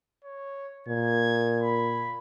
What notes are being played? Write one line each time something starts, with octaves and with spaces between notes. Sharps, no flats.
C#5
A#2 G#6
B5